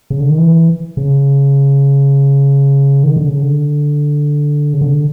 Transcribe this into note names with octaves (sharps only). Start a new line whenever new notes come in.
C#3
D3
D#3
E3
C#3
D#3
D3
C#3
D3
C#3
D3